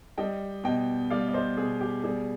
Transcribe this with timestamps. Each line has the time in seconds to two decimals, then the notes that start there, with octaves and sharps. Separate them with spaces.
0.18 G3 D#5 G5
0.64 B2 D#5 G5
1.10 G3 D5 F5
1.28 D5
1.34 C5 D#5
1.57 B2 G#4
1.81 G4
2.04 G3 G#4